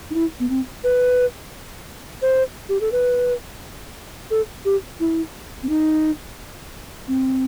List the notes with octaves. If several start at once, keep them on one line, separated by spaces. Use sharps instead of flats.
D#4
E4
B3
C4
B4
C5
G4
A4
B4
A4
G4
E4
C4
D#4
C4